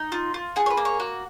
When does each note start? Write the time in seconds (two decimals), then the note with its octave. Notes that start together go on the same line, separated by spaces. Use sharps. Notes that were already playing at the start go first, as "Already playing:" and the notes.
Already playing: D#4
0.12 F4
0.34 F4
0.56 G#4 F#5
0.66 C#5
0.70 B4
0.77 A#3
0.85 C#5
1.00 F#4